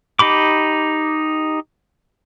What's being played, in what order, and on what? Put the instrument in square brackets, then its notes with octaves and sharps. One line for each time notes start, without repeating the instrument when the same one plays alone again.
[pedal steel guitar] D#4 G4 B5 D6